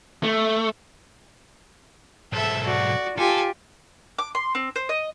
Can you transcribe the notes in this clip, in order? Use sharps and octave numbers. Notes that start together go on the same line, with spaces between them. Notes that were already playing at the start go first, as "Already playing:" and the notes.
A3
B1 G#2 A4 E5
F#4 D5
F4 G4 A4 G#5
D6
C6
C4
C5
D#5